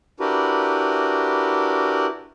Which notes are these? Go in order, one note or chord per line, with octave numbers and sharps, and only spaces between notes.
D4 E4 F#4 G4 A#4 B4